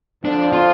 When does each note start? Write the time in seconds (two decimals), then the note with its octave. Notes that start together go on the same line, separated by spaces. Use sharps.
0.24 F2 D3 F3 D4
0.53 F4